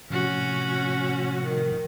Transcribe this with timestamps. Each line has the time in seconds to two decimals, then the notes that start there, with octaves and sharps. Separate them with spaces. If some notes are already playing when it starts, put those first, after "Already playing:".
0.10 A2 C3 F3 C#4 F#4
1.44 D#3